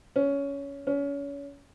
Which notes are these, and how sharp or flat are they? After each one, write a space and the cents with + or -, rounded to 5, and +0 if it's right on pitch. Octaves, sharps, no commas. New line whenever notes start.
C#4 +15
C#4 +30